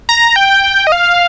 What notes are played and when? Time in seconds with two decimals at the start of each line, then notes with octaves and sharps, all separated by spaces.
0.09 A#5
0.36 G5
0.87 D#5
0.92 F5